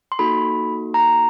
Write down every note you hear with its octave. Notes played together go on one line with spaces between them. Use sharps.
C6
A#3 D#4 F#4 A4 B5
A#5